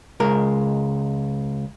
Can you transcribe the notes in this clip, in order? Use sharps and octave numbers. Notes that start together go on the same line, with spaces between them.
C#2 G#3 A#4